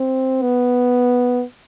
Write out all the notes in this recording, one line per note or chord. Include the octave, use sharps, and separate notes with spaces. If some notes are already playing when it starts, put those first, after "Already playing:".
Already playing: C4
B3